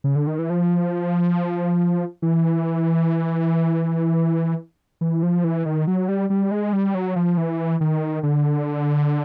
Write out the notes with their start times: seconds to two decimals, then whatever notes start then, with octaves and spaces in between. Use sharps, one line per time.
0.04 C#3
0.16 D3
0.27 D#3
0.39 E3
0.50 F3
2.22 E3
5.01 E3
5.23 F3
5.44 E3
5.66 D#3
5.87 F#3
6.08 G3
6.30 G3
6.51 G#3
6.73 G3
6.95 F#3
7.16 F3
7.37 E3
7.81 D#3
8.23 D3